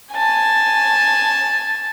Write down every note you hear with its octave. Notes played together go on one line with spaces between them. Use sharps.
G#5 A5